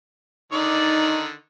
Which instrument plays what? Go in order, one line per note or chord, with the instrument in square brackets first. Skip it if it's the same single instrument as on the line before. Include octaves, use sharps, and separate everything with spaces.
[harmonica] D3 D#3 D5 [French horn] D#4